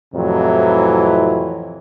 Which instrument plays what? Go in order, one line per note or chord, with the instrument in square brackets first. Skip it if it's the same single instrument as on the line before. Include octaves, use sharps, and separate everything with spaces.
[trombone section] F2 A2 C3 E3 F#3